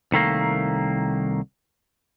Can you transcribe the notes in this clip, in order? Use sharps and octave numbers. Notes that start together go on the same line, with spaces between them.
C2 D#3 A3 A#3